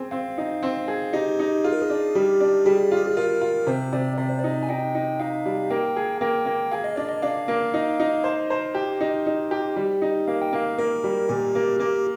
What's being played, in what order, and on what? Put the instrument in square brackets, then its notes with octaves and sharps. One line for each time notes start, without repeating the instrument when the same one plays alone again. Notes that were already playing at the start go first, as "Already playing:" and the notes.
Already playing: [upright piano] C4 G#4
[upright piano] C4 [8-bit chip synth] F5
[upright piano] D#4
C4
G#4
[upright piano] D#4 [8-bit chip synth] G4
[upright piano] D#4
[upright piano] F4 [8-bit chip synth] G#4
[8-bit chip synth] A#4
G#4
[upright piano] D4
[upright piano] G3 [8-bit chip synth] G4
[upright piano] D4
[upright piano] G3 [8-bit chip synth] G#4
[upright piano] F4
[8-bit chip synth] G4
G#4
[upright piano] F4 [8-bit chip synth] A#4
[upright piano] F4
[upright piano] C3 [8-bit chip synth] C5
[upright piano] C3 [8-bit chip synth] D5
[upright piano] C3 [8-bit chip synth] D5
[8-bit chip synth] C5
D5
[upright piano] D#4
[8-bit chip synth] G#5
[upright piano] D#4 [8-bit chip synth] G5
[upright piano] D#4
[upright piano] D#4 [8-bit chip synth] F5
[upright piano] G3
[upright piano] A#3 [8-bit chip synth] G5
[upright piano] G#4
[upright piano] A#3 [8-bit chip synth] G5
[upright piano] A#3
[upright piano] G#4 [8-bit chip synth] F5
[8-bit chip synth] D#5
[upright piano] D4 [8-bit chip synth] D5
[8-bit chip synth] D#5
[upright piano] D4 [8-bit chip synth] F5
[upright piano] A#3
D#4
D#4
C5
C5
G4
D#4
D#4
G4
G3
D#4
[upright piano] A#3 [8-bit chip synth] F5
[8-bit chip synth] G5
[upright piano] A#3 [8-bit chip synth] F5
[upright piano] A#3 [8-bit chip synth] A#4
[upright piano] G3
[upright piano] A#2 [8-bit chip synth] G4
[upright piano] A#3
[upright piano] A#3 [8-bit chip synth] G4